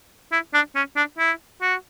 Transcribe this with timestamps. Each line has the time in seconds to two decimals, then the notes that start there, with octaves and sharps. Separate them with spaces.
0.32 E4
0.54 D4
0.75 C#4
0.96 D4
1.18 E4
1.62 F#4